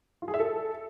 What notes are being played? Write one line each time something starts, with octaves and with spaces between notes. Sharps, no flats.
F4
G#4
E5
A4